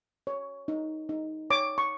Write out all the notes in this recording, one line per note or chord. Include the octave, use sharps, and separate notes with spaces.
C#5
D#4
D#4
C#5 D6
C#6